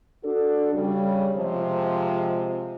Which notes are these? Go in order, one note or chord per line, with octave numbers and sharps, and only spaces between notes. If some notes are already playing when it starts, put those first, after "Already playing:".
D4 F#4 A4
C#3 G3
C3 F3 G#3 C5